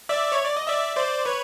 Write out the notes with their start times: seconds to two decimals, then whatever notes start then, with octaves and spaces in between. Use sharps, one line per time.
0.09 D5 E5
0.32 C#5
0.44 D5
0.57 D#5
0.67 D5 E5
0.96 C5 D5
1.25 B4 C#5